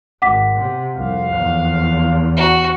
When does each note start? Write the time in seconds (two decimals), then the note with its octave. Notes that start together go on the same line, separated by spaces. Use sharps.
0.22 G#1 F#5 D6 B6
0.58 C3
0.96 C2 F2 F5
1.32 E2
2.37 F#4